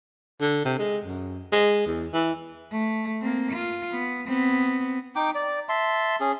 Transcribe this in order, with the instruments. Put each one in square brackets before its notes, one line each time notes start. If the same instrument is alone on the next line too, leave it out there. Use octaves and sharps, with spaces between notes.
[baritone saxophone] D3
C3
G#3
F#2
G#3
E2
E3
[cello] A3
A#3 C4
F4
B3
B3 C4
[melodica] D#4 G5 D6
D5
E5 A5 C6
C#4 G#4